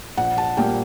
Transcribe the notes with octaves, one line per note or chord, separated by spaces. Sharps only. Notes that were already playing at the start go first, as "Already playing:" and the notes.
A#1 F#5
A5
A#2 G3 A#3 G5